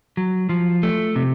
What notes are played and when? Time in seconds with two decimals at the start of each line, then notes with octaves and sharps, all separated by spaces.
0.17 F#3
0.49 F3
0.83 A3
1.16 C3